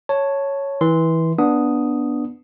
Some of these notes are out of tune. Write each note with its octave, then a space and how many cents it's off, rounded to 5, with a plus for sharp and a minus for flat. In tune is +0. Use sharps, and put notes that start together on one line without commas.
C#5 +0 A5 +5
E3 -20 C6 -10
B3 -15 D4 +0 D#6 +0